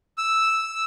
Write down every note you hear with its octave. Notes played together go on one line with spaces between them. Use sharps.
E6